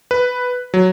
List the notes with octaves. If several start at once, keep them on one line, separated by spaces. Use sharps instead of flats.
B4
F#3